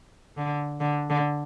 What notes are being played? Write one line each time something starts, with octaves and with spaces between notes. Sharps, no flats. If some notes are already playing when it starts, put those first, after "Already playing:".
D3
D3
D3